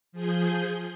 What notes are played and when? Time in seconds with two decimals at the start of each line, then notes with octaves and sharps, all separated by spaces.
0.12 F3 G#4 G6